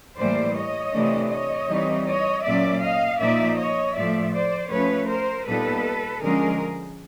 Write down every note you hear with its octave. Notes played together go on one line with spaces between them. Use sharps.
A2 E3 G3 A#3 C5 D5
C#5 D#5
C3 E3 A3 D4
C#5 D#5
E3 G3 C4 D#4
C#5 D#5
A#2 F#3 A#3 C#4 D5 E5
D#5 F5
A#2 F3 A#3 D#4 D5 E5
C#5 D#5
A2 F3 A3 D5 E5
C5 D5
F3 A3 C#4 B4 C#5
A#4 C5
A#2 G3 B3 D#4 A4 B4
D3 F3 G#3 C#4 G#4 A#4